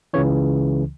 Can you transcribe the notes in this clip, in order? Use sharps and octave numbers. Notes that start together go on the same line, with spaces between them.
C#2 C#3 E3 C#5